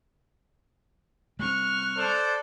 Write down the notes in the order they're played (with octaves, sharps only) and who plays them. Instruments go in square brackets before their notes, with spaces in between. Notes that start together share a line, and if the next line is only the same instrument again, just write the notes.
[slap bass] G3 C4 [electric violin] C#6 F6 [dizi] F#6
[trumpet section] A4 C5 D5